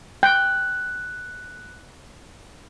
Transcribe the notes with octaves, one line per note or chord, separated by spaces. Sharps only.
G5 F#6